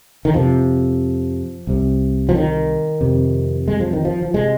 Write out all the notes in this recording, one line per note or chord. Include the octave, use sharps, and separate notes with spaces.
D#3
F2 C3 F3
C2 C3
F3
D#3
F2 C3
G#3
F3
D#3
F3
F3
C3 G#3